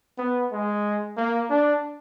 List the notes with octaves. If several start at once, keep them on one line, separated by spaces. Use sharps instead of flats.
B3
G#3
A#3
D4